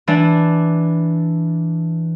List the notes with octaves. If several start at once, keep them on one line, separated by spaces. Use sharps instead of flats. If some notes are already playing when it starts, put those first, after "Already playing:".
E3 D4